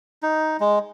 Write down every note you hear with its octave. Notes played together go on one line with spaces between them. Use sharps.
D#4
G#3